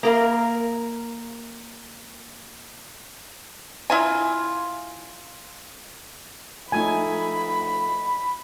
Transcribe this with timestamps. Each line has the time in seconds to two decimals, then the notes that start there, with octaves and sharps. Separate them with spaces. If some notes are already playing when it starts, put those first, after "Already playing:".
0.03 A#3 A#4 F5
3.90 E4 F4 G#5
6.72 F3 A3 D#4 G#5 B5